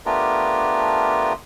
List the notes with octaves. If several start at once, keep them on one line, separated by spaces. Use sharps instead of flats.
A3 B3 D4 F4 G4 A#4